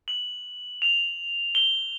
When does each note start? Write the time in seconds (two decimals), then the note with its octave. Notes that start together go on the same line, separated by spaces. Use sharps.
0.08 F#7
0.82 F7
1.55 G7